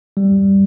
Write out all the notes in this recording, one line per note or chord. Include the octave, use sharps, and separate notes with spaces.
G3